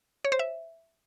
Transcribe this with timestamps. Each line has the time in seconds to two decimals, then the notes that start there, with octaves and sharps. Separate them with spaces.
0.25 C#5
0.32 C5
0.39 E5